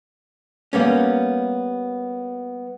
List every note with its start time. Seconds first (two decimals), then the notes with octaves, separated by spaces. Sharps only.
0.73 G3 A#3 B3 C#4